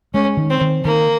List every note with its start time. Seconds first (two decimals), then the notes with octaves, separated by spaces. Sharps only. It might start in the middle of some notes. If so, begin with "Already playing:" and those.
0.14 G#3 C#4
0.37 D#3
0.50 C4
0.61 D#3
0.85 D#3 A#3